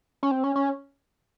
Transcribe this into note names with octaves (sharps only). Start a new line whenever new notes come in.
C#4
C4
C#4
C#4